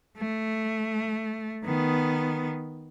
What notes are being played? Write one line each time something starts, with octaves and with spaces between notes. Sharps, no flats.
A3
D#3 B3